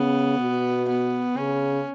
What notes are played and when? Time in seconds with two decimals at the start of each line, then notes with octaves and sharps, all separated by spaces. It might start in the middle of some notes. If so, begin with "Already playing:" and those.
Already playing: C#3 B3
0.39 B2
0.88 B3
1.36 C#3 C#4